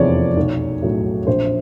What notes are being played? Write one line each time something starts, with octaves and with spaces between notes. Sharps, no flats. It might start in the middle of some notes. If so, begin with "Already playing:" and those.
Already playing: F1 E2 C3 F3 C#5 D5
B1
A2 F#3
A#1 C5